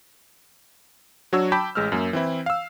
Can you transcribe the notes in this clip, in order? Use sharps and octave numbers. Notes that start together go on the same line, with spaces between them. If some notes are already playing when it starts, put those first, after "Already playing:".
F#3 D4 F#4 C#5 E6
G5 A5 B5 D6 G6 B6
A1 G#3 E6 F6
F#2 A#3
E3 C4 E4
F5 E6